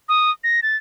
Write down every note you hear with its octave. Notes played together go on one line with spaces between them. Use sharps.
D#6
A#6
A6